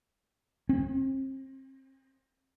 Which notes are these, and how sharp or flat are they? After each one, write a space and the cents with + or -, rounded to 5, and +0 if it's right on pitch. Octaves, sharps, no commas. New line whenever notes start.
C4 +35